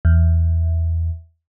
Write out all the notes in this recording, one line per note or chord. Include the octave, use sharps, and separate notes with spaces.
E2